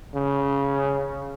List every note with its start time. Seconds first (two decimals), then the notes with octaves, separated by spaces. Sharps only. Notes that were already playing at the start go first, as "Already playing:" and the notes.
0.15 C#3